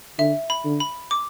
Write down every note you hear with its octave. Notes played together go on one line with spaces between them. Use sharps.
D3 E5
B5
D3
B5
D6